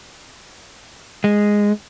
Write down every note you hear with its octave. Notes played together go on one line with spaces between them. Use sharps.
G#3